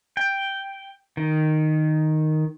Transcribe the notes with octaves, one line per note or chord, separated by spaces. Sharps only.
G5
D#3